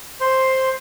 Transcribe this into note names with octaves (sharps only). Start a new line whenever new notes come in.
C5 C6